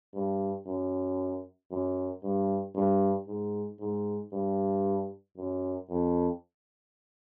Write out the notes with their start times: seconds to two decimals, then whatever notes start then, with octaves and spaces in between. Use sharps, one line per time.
0.14 G2
0.66 F#2
1.71 F#2
2.23 G2
2.75 G2
3.27 G#2
3.80 G#2
4.32 G2
5.37 F#2
5.90 F2